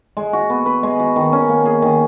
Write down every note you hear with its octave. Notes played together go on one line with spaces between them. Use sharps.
G#3
F#4
B3
B4
G#3
F#4
D#3
C#4
A#3
G#4
D#3